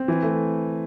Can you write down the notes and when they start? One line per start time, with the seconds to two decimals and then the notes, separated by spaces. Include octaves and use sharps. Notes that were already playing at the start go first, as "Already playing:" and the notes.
Already playing: C4
0.08 E3
0.23 A3